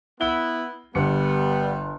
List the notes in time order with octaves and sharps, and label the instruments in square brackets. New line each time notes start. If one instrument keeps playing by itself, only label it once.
[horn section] B3 E4 [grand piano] G7
[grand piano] G1 C#7 [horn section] G3 B3